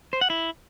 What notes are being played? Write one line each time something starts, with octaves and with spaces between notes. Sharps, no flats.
C5
F#5
E4